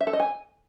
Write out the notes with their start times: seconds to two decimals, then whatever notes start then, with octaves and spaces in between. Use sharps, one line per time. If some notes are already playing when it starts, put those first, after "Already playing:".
0.01 E5
0.07 A4
0.13 D#5
0.20 G#5